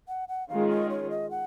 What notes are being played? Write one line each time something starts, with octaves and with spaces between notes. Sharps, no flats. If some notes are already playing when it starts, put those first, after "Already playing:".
F#5
F#5
D#3 G#3 C#4 F4 G#4 F5
D#5
C#5
D#5
F#5